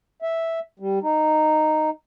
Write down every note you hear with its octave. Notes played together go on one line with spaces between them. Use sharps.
E5
G3
D#4